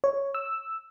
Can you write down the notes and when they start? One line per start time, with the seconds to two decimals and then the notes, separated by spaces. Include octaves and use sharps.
0.04 C#5
0.35 E6